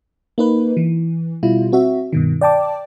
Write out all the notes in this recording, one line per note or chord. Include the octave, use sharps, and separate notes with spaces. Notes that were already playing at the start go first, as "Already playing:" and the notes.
A#3 D#4 B4
E3
B2 G3 E4 F4
C4 F#4 E5
G2 B2 D#3
D5 G5 A5 D6